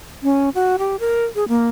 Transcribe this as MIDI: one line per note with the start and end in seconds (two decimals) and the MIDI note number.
0.23 0.49 61
0.55 0.76 66
0.78 0.96 67
1.00 1.24 70
1.35 1.44 68
1.48 1.69 58